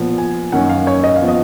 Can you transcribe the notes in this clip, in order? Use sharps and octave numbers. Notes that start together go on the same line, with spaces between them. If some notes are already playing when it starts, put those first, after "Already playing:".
Already playing: A#2 F3 B3
G#5
F#2 D#3 A#3 C#4 F#5
F5
C#5
D#5
F5
F3 B3
D#5